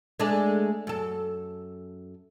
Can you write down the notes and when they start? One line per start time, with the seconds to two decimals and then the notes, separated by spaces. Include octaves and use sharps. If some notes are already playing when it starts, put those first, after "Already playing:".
0.20 G#3 A3 D4
0.87 F#2 A4